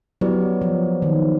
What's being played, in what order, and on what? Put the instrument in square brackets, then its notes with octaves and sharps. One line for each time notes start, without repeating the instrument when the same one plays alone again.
[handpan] F#3 [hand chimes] B3 E4 G4 B4 D5
[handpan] F3
D#3